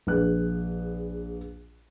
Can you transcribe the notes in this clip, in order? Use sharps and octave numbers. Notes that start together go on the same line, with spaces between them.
A#1 G#4 B4 F#6